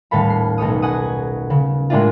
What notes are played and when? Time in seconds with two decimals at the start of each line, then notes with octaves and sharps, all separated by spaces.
0.11 D#1 A2 A4 F5 B5
0.30 C7
0.58 B1 A3 C#5 D#6
0.82 F#5 G#5 C#6 D#6
1.50 C#3
1.90 A2 G#3 A#3 D4 E4 F4